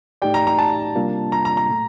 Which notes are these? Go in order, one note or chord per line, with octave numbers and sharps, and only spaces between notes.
A2 A3 D#4 G4 D5 G5
A#5
A#5
A5
C3 G3 A#3 D4 F4
A#5
A#5
A#5
A#2 A3